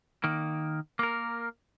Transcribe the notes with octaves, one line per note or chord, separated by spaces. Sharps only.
D#3 A#3
A#3 A#4